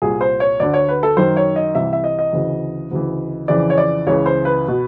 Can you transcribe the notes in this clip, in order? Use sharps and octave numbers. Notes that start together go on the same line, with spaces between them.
C2 A#2 G#4
C5
C#5
D2 D3 D5
C#5
B4
A4
F#2 D#3 C5
C#5
D#5
C2 C3 E3 E5
E5
D#5
D#5
D2 C#3 E3
D2 C#3 E3
F2 C#3 E3 D5
C#5
D5
C#2 C#3 E3 C#5
C5
B4
B2